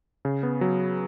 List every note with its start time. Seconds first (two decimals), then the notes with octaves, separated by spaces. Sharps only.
0.25 C#3
0.43 B3
0.61 F#3